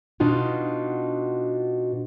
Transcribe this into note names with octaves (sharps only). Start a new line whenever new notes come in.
B2 D4 D#4 F4 F#4